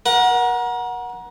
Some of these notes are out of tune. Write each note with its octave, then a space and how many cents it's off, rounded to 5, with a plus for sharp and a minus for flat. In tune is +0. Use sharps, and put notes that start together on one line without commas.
A#4 +30 F#5 -10